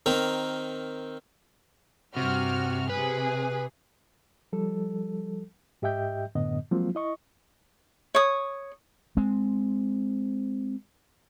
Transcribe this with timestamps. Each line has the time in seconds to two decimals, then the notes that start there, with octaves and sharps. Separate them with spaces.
0.06 D#3 C4 A#4
2.17 G2 C3 F#4 F6
2.89 C3 G#4 B4
4.53 F3 G3 A4
5.82 G#2 G4 D#5 E5 G5 G6
6.35 F#2 A2 D3 B3 D#5
6.71 F3 F#3 G#3 A#3 C4 F4
6.95 E4 D#5 C#6
8.15 C#5 D#6
9.17 G#3 C4